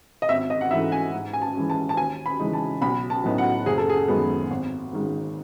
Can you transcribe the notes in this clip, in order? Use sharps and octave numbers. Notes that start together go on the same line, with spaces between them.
D#5
G#1 E5
D#5
F#5
G#2 E3 A3 E5
G#5
G#2
G#5
A5
E3 G#3 C#4
A5
A5
D#2 G#5
B5
C#3 E3 G#3 D#4
A5
B1 B5
A5
A2 F#3 B3 D#4
F#5
F#1 G#4
A4
G#4
F#2 D#3 G#3 B3
G#1
G#2 D#3 G#3